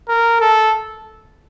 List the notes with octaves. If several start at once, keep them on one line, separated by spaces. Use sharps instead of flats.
A#4
A4